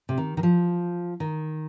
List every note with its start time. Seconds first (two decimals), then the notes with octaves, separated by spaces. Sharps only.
0.09 C3
0.18 D#3
0.37 D#3
0.43 F3
1.20 D#3